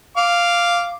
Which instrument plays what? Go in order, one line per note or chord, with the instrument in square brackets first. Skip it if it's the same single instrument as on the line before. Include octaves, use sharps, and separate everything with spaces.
[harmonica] F5 D6